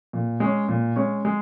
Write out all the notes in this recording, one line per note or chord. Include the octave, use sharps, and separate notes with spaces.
A#2
G#3 C#4
A#2
G#3 C#4
G#3